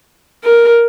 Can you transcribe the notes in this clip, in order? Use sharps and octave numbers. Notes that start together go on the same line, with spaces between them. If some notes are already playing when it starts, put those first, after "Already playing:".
A#4